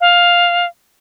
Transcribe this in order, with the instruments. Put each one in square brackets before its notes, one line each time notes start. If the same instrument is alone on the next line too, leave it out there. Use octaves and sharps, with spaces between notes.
[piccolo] F5